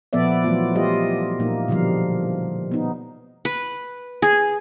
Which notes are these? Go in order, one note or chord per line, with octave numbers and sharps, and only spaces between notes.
A#2 F3 B3 A4 D5 E5
E3 F#3 A3 B3 F4
F#3 G3 F4 G4 D#5
A#2 A#3 D#4
B2 D3 F3 G3 F5
B3 D#4
B4
G#4